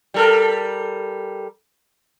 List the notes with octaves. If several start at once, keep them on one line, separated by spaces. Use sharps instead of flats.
G3 A4 A#4